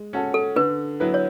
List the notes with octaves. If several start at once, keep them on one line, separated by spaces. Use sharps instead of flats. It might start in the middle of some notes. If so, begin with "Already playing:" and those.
Already playing: G#3
C#4 F#4 A4
A4
D3 B4
F#3 B3 E4 B4
C#5